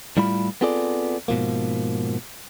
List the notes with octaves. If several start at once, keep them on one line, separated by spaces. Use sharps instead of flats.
A2 G3 E4 F4 B5
B3 C4 F4 G#4 A4 D5
G#2 B2 F3 A#3